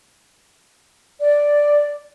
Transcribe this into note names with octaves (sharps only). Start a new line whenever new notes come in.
D5